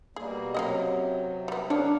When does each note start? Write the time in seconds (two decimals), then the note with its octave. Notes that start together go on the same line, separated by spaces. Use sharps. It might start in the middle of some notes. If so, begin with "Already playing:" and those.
0.16 B2 G3 A#3 G#4
0.54 C3 F#3 A#3 C#4 D#5
1.48 G3 B3
1.70 D#3 G#3 D4 C#5 F5 F#5